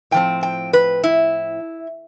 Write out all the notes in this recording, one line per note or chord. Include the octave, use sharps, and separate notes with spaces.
A2 F3 C4 G5
G5
B4
E4